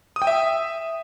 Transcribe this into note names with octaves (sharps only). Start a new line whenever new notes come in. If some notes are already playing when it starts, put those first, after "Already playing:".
D#6
G5
E5